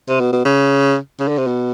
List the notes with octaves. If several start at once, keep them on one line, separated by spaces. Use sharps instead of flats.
C3
B2
B2
C#3
C#3
D3
C3
B2